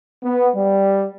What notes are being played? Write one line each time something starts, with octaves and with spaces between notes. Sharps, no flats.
B3
G3